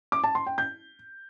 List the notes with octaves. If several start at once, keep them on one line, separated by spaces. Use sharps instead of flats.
D6
A5
C6
G5
G6